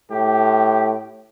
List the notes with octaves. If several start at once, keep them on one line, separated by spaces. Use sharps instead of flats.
A2 G4